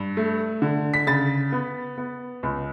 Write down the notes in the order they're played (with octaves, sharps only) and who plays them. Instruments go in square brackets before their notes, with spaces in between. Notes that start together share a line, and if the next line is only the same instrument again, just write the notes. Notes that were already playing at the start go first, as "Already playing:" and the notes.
Already playing: [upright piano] G2
A3
D3
B6
C#3 A6
B3
B3
C#2